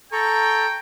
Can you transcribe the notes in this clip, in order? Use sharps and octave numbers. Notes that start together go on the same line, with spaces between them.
A4 G5 A#5 C#6